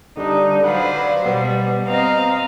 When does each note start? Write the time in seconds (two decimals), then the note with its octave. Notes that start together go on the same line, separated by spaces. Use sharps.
0.17 D3 G3 D4 D#4
0.64 F#3 B4 C5 D5 F5 F#5
1.26 B2 G3 B3
1.86 C4 D#5 F5 A#5